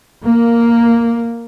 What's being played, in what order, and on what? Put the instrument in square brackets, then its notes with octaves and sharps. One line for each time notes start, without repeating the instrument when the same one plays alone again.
[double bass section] A#3